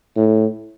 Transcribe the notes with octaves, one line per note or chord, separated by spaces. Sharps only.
A2